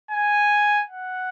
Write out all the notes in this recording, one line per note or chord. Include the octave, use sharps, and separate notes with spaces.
G#5
F#5